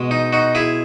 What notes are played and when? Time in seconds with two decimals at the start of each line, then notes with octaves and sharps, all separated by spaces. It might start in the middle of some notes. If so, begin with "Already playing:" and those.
Already playing: B2 G#3
0.11 D#4
0.33 D#4 F#4
0.55 E4 G#4